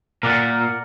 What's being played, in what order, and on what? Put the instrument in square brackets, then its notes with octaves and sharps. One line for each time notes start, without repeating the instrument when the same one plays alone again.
[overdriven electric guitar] A#2 [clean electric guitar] A#4 D5 F#5